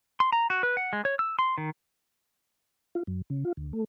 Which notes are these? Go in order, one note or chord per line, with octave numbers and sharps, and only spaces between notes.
C6
A#5
F#4
B4
F#5
G#3
C#5
E6
C6
D#3
F4
F#2
C#3
F4
D2
A3